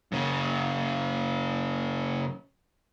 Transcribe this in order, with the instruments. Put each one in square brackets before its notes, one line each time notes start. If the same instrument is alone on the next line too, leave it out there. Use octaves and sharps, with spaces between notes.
[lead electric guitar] F#2 C#3